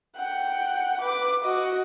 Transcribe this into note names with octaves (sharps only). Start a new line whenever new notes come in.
F#5 G5
B4 D6
F#4 D#5